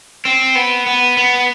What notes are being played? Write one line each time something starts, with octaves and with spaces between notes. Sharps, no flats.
C4
B3
B3
B3